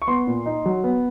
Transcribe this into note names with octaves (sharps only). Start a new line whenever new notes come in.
C#6
B3 C6
A#2
D#4
F#3
B3